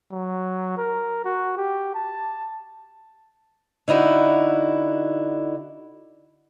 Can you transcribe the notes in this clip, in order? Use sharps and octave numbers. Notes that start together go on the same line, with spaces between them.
F#3
A#4
F#4
G4
A5
D3 D#4 E4 F#4